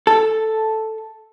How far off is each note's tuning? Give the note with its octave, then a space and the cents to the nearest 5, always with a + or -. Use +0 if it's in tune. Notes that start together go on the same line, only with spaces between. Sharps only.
A4 +0